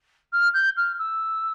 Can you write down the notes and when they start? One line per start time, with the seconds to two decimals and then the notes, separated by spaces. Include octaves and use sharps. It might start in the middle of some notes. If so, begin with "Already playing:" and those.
0.32 F6
0.54 G6
0.76 F6
0.98 E6